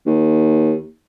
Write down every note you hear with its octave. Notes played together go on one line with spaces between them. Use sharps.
D#2